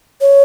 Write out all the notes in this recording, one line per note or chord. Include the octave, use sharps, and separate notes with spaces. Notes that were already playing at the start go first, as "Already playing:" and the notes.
C#5